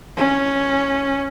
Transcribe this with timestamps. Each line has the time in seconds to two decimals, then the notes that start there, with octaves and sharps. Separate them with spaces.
0.17 C#4